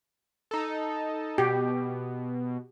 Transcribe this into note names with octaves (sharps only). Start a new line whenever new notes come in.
D#4 A4
B2 G4